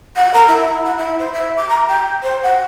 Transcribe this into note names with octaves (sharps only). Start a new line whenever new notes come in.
F#5
A#4
E4
F#5
E4
C5
E5
D6
A#5
G5
C5
F#5